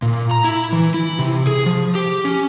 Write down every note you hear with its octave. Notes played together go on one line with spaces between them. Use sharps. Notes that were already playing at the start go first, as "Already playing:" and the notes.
A#2
A#5
E4
E3
E4
C3
G#4
F3
G4
C#4